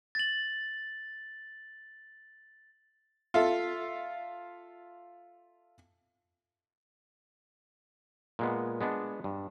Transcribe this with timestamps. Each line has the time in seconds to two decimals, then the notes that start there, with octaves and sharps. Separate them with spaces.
0.15 A6 F#7
3.34 F4 A4 E5
8.39 A#2 G#3 B3
8.81 G#3 B3 D4
9.24 G2